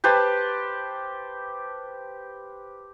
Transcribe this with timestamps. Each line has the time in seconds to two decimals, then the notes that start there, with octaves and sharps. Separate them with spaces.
0.04 G4 B4 C5 A5